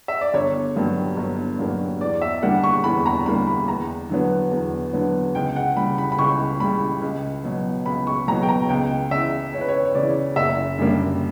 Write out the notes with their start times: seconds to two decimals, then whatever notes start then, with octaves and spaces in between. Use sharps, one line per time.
0.08 E5
0.21 D5
0.34 G1 C#5
0.76 G2 F#3 A#3
1.17 G1
1.59 G2 F#3 A#3
2.01 E2 D5
2.22 E5
2.43 D3 G3 A#3 F#5
2.64 C#6
2.84 E2 B5
3.06 A#5
3.26 D3 G3 A#3 B5
3.47 B5
3.68 E2 A#5
4.10 D3 F#3 B3
4.51 E2
4.93 D3 F#3 B3
5.35 C#2 G5
5.56 F#5
5.77 C#3 G3 B5
5.98 B5
6.12 B5
6.19 C#2 C#6
6.60 C#3 G3 B5
7.02 C#2
7.44 B2 F#3
7.86 C#2 B5
8.07 C#6
8.28 B2 F#3 A#5
8.43 G5
8.49 A#5
8.69 C#2 G5
9.11 C#3 E3 E5
9.53 C#2 C#5
9.61 B4
9.68 C#5
9.85 C#5
9.95 C#3 E3 D5
10.36 F#1 E5
10.78 F#2 D3 G3 A#3